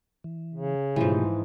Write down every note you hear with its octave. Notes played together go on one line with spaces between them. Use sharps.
E3
C#3
G#2 B2 E3 F3 A3 G4